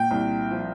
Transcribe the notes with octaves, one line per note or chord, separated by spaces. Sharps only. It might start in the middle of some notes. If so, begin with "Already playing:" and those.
Already playing: A#2 G5
C2
F3